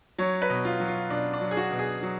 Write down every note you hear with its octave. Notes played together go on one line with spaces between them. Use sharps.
F#3 C#5
B4
B2
F4
F#3
F4
B2 D4
D4
F#3
G#4
F#4
B2
G#4
F#3